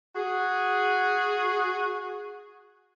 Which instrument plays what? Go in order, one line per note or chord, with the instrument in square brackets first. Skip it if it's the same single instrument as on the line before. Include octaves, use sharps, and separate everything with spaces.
[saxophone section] F#4 G#4